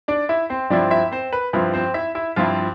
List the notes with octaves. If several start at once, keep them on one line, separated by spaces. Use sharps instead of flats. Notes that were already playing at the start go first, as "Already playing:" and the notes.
D4 D5
E4 E5
C4 C5
G2 F3 C4 D4 E4 D5
E4 E5
C4 C5
B4
G2 F3 C4 E4 B4
C4 C5
E4 E5
E4 E5
G2 F3 C4 E4 F4 F5